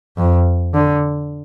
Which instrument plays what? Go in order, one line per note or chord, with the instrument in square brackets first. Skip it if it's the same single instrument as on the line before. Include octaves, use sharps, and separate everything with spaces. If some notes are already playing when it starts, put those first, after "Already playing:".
[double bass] F2
D3